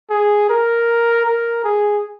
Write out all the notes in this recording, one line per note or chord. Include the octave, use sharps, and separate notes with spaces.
G#4
A#4
A#4
G#4